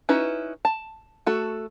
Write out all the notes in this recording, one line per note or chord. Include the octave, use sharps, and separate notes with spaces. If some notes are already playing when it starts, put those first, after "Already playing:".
C#4 D#4 E4 F#4 B4
A5
A3 F#4 A4